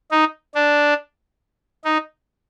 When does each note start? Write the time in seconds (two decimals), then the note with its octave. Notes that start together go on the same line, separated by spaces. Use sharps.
0.11 D#4
0.55 D4
1.84 D#4